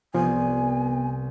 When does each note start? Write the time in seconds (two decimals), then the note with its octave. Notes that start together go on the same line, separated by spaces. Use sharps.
0.15 C2 F3 B3 G#5